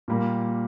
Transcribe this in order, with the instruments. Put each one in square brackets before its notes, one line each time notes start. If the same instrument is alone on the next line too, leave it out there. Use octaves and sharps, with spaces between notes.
[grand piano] A#2 G3 A#3